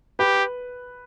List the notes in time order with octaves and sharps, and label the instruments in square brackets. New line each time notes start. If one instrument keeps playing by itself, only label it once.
[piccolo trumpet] G4 [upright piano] B4